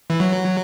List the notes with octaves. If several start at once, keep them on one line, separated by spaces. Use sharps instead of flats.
E3
F#3